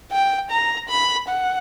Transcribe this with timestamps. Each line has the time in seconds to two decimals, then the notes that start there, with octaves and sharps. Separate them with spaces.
0.12 G5
0.51 A#5
0.90 B5
1.29 F#5